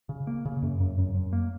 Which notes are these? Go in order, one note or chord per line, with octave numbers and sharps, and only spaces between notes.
C#3
A#3
C#3
F#2
F#2
F#2
F#2
A#3